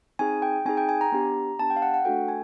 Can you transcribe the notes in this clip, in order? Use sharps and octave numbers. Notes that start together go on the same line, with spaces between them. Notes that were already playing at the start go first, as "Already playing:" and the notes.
C4 D#4 G#4 G#5
G5
C4 D#4 G#4 G#5
G5
G#5
A#5
B3 D4 G4
B3 D4 G4 A5
G5
F5
F#5
F#5
A3 D4 F#4 A4 G5
G#5